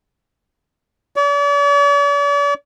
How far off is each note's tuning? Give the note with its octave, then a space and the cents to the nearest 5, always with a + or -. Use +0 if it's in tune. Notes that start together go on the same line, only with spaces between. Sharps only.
D5 -45